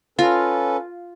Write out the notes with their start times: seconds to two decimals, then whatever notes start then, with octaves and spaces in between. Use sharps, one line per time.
0.19 C#4 F4 A4 B4 F5